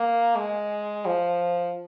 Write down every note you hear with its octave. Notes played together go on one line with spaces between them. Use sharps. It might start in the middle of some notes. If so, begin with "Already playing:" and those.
Already playing: A#3
G#3
F3